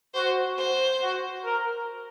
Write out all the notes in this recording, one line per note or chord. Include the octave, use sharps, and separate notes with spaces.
F#4 C5
C5
F#4
A#4